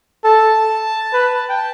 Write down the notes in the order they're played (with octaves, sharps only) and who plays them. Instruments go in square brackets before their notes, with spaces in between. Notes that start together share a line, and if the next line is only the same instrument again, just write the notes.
[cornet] A4 [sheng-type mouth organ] A5
[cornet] B4
[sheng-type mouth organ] G5
A5